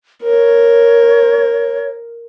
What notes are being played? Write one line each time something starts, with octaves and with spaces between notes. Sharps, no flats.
A#4 C#5